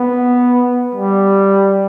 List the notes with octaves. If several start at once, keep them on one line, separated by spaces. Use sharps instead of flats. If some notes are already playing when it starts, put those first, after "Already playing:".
Already playing: B3
G3